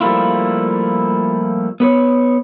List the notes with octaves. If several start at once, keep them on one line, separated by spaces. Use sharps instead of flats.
F3 G3 A3 A#3 E4 F4
B3 B4 C#5